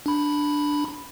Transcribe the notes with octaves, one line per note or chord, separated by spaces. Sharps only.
D4 B5